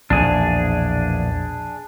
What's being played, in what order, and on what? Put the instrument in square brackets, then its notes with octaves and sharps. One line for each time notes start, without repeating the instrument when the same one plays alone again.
[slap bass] A#1 E2 B2 [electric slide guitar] D4 G#4